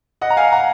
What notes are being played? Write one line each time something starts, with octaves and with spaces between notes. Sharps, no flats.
D#5 F#5
A#5
F5 G#5
F#5 A#5